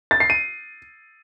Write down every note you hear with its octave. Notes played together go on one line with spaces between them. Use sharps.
A6
C7
D#7